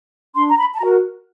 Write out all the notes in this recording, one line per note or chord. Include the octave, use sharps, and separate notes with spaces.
D4 C6
A#5
B5
A5
F#4 A#4 A#5